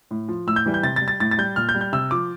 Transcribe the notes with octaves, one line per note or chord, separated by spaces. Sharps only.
A2
F3
A2 E6
G6
E3 G3
G6
C3 A6
A6
G3
A6
A2 A6
A6
G3 G6
A#2 F6
G6
G3
G6
C3 E6
F3 D6